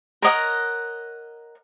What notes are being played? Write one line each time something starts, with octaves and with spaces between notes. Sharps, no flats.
A#4 C#5 D#5 F#5